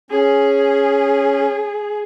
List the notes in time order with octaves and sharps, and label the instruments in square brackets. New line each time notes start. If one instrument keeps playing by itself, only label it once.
[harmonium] C#4 [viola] G#4